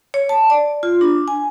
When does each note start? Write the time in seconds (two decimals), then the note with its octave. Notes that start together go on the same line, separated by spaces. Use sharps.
0.14 C#5
0.29 A5
0.50 D5
0.83 F4
1.01 D4
1.28 G#5